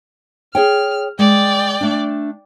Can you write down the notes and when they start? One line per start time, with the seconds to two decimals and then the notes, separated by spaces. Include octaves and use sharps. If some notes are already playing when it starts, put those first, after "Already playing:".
0.55 G#4 C#5 G5 F6
1.19 G#3 D5 G5
1.81 A3 D4